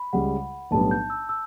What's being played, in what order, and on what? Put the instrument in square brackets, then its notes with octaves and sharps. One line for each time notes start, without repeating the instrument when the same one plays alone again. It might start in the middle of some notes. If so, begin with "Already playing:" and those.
Already playing: [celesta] B5
[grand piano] C#2 C#3 G3 [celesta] F#5
[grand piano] B1 A2 G3 B3 D4 [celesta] A5
[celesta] G6
E6
E6